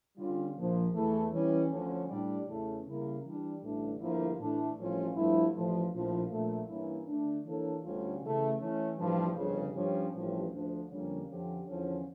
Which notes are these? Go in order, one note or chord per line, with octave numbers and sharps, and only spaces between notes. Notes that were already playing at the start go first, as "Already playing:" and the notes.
D3 G3 C#4 F4
A#1 A#2 F3
E2 E3 A3
E3 G3 C#4
D2 D3 F3 C#4
A2 G3 D4 G4 D5
E2 C#3 E3 A3 C#4
C#3 G3 A#3 E4 A#4
E3 G3 D4
A1 G2 D3 A3 D4
G1 G2 F3 A#3 E4
A2 E3 A3 D4
A1 G2 F3 C#4 F4
G2 F3 A3 E4
A1 A2 F3
A#1 A2 F3
A#1 A#2 A3
G2 E3 A#3 C#4 E4
D3 A3 D4
E3 A#3 D4 A4 C#5
D2 D3 G3 C#4 F4
C#3 E3 A3
E3 A3 C#4
A1 G2 F3
G1 F2 C#3
G2 F3 C#4 G4 C#5
A1 G2 F3 C#4 G4
D2 D3 F3
F2 D3 G3 A#3 C#4
F2 D3 F3 C#4 G4
E2 D3 F3 C#4